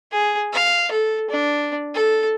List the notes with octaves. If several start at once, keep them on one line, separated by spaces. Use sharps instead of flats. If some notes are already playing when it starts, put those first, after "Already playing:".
G#4
F5
A4
D4
A4